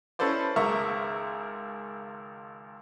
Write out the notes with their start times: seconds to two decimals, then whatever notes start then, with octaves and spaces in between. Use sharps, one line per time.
0.19 C#4 E4 A4 B4 C5 D5
0.56 G#1 C#2 A#4 E5 C#6